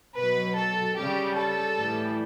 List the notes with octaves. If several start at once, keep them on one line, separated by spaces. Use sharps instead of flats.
B2 F#3 B4
A4
C#3 G3 G4
A4
A2 E3 G3